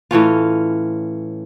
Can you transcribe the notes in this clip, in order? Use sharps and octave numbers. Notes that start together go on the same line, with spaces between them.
A2 E3 C#4 F4